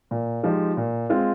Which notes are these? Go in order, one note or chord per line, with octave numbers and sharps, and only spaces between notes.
A#2
F3 G#3 D#4 G4
A#2
G#3 C4 F4